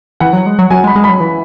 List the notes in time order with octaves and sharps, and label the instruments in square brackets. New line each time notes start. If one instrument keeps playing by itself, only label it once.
[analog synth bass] E3 [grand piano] F#5
[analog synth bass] F#3
G#3
F#3
[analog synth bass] F#3 [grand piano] G#5
[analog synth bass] G#3
[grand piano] B5
[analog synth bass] G#3
[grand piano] B5
[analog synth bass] F#3
E3